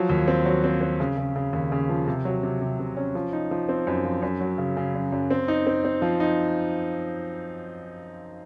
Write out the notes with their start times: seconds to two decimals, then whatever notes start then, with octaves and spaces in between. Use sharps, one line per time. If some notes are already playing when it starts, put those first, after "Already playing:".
Already playing: F3 F#3
0.09 D#2
0.28 C4
0.46 F#3
0.64 C4
0.81 C4
1.00 C#3
1.17 C#3
1.36 C#3
1.53 D#2
1.72 C#3
1.89 F3
2.07 C3
2.25 F#3
2.43 C3
2.61 C3
2.79 C3
2.97 C#4
3.15 F3
3.33 D#4
3.51 F3
3.69 C4
3.87 F#2
4.05 F3
4.22 F#2
4.41 F#3
4.58 C#3
4.77 C#3
4.94 F#2
5.12 F#2
5.30 C4
5.48 D#4
5.67 C4
5.85 C4
6.02 F3
6.20 D#4